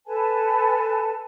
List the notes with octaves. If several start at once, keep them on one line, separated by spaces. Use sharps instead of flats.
A4 B4 G#5 A5